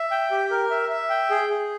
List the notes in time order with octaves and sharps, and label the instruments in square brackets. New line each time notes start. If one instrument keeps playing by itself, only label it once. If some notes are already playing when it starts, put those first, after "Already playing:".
Already playing: [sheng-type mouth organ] E5
G5
G4
A#4
E5
E5
G5
G#4
G#4